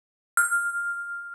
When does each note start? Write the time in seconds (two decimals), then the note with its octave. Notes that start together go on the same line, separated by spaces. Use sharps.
0.37 F6